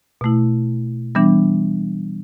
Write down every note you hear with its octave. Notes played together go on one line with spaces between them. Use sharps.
B2 A3 E4
E3 G3 B3 D4